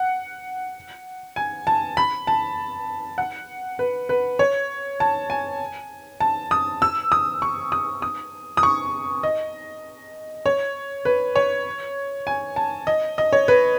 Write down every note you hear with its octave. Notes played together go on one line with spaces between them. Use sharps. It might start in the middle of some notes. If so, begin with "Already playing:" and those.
Already playing: F#5
G#5
A5
B5
A5
F#5
B4
B4
C#5
A5
G#5
A5
D#6
E6
D#6
C#6
D#6
D#6
D#6
C#6
D#5
C#5
B4
C#5
G#5
A5
D#5
D#5
C#5
B4